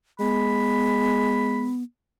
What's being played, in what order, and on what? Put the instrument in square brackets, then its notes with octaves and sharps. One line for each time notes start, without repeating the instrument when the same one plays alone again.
[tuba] G#3 [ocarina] B3 [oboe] B5